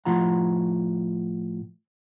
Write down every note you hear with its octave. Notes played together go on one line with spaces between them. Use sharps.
A2 F3 F4 F#5 A#5